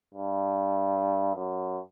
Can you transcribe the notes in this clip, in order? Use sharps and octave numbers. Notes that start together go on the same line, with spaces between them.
G2
F#2